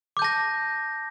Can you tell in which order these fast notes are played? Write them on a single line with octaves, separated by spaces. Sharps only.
D6 G6 A5 A#6